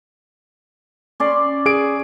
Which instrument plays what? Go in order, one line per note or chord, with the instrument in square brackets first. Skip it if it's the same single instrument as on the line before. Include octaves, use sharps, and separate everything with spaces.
[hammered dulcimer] C#4 D5 C6
[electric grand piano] G#4 D7